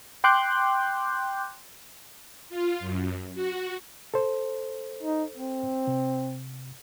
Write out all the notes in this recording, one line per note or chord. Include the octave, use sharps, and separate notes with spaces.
G5 C6 D6 F#6 G6
F4
F#2
F#4
A4 C5
D#4
C4
C3